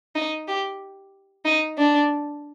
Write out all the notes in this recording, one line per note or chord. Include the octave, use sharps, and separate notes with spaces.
D#4
G4
D#4
D4